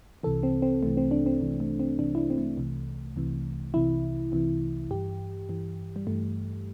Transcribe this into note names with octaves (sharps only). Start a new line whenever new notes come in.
C2 C3 E3 A4
C4
C4
C2 C3 E3 A3
C4
D4
C4
C2 C3 E3
A3
C4
C2 C3 E3 D4
E4
D4
C4
A3
C2 C3 E3
C2 C3 E3
C2 C3 E3 E4
C2 C3 E3
G2 E3 G4
G2 E3
G3
G2 E3 A3